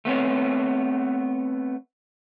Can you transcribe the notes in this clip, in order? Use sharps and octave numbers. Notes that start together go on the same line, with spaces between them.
A3 B3 C4 C#5